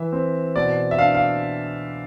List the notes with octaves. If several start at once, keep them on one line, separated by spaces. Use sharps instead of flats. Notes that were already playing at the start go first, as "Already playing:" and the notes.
Already playing: E3 E5
C4
B2 D5
E5
D4 F5
F5